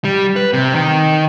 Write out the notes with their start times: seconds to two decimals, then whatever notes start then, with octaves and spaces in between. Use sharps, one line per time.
0.04 G3
0.36 B4
0.53 C3
0.75 D#3